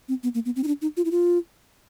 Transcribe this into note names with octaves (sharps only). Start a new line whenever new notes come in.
C4
B3
A#3
B3
C4
D#4
D4
D#4
F4
E4
F4